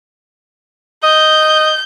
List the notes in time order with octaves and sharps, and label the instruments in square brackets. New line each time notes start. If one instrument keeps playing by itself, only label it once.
[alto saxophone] D#5 [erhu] G6